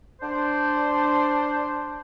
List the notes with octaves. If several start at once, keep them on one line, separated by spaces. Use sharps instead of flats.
D4 C5